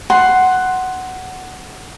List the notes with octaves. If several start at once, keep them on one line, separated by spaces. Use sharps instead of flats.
F#5 C6